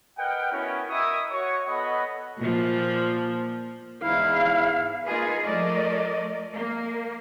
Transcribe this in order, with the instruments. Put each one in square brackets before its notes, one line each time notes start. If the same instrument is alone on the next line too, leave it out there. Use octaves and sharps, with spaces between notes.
[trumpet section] A#4 B4 D#5 F#5 G5
B3 C#4 E4 F#4 A#4 C#5
E4 A#4 D#5 E5 C#6 D#6
F#4 C#5 C#6
B3 A4 C#5 D#5 F#5 B5
[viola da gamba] A#2 F3
[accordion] E2 G#2 E4 [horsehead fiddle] F5
[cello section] A#3 D#4 F4 G#4 B4
F3 A3 A#4 D5 D#5
A#3